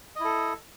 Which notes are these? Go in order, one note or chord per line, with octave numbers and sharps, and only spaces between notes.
E4 A4 D#5